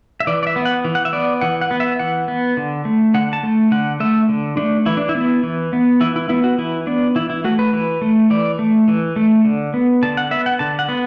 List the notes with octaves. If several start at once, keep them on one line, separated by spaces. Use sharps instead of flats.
E5
E3 D5
D5
E5
B3
F#5
E3
F#5
E5
B3 D5
E3 F#5
F#5
B3
E5
E3 F#5
B3
D3
A3
D3 F#5
A5
A3
D3 F#5
A3 E5
D3
A3 D4
E3 E4
D4
E4
B3
E3
B3
E3 E4
E4
B3 E4
F#4
E3 E4
B3 D4
E3 E4
E4
A3 F#4
B4
E3
A3
E3 D5
A3
E3
A3
D3
B3
D3 A5
F#5
B3 E5
F#5
D3 A5
F#5
B3